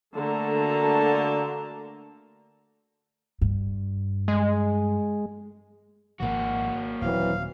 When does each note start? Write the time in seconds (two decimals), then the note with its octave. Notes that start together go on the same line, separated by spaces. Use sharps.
0.15 D3 A3 A#3 F#4 A5 A#5
3.41 G2
4.28 G#3
6.20 G#1 C#2 F3 A#3 F#4
7.02 D#1 E3 F#3 C4 F5